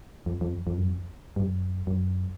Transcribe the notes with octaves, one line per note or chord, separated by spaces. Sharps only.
F2
F2
F2
F#2
F2
G2
F#2
F#2